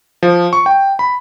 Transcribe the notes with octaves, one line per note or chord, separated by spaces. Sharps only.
F3
C#6
G5
B5